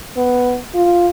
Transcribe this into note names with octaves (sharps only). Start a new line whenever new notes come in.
B3
F4